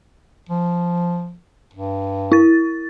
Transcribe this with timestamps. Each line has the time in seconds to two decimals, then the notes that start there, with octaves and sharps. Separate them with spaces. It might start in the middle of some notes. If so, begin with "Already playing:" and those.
0.49 F3
1.74 G2
2.32 E4 A6